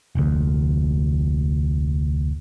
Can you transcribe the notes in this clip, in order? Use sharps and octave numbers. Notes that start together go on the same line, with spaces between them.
F1 D2